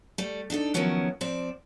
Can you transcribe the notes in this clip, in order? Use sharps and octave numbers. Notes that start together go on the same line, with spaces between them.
G3 A3
D4 D#4 F#4 A4
D#3 F3 F#3 B3 C#4 E4
F3 C4 D5